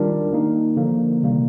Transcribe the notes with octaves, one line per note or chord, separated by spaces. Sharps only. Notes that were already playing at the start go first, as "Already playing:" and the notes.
Already playing: D#3 G3 D4 F4 A#4
D#3 A#3 D#4
D3 F3 A#3
C3 D#3 G3 A#3